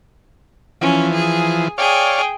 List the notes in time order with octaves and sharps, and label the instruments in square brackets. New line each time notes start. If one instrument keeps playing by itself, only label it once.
[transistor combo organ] E3 F3 [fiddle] C#4
[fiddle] G#4
[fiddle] G#4 G5 [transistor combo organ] C#5 D5 F5